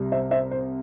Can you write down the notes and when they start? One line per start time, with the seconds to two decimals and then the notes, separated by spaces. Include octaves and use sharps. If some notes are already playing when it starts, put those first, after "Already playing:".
Already playing: C2 C3 G3
0.12 C5 E5
0.31 C5 E5
0.51 C5